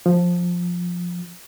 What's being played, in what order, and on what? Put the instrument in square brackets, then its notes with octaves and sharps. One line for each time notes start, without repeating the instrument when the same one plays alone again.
[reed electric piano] F3